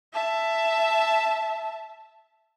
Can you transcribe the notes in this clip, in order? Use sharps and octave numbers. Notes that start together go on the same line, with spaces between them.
E5 A5